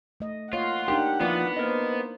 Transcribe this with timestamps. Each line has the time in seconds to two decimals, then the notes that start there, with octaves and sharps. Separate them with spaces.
0.20 A3 D#5
0.53 A#3 F4 C#5 D#5 F#5
0.88 D4 D#4 G4 A#4
1.21 F3 A#3 B3 E4 F4 B4 D5
1.56 A#3 A#4 C5 D#5